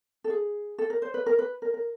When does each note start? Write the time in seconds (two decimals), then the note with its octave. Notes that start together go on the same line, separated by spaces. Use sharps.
0.24 A4
0.30 G#4
0.78 A4
0.90 A#4
1.02 C5
1.14 B4
1.26 A#4
1.39 B4
1.62 A#4
1.74 A#4